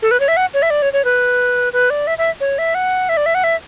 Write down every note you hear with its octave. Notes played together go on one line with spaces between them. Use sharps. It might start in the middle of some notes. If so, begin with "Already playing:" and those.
A4
B4
C#5
E5
F#5
C#5
E5
D5
C#5
C#5
B4
B4
D5
E5
E5
C#5
E5
F#5
E5
D5
E5
F#5
E5